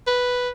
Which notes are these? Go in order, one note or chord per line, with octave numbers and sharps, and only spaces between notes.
B4